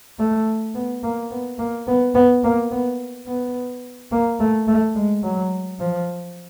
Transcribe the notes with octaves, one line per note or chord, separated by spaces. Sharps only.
A3
B3
A#3
B3
A#3
B3
B3
A#3
B3
B3
A#3
A3
A3
G#3
F#3
F3